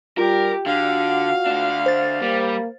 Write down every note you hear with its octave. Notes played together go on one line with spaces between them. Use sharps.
G3 F4 G4 A#4
D3 F#4 F5
D2 D4
C5 A6
G3 A#3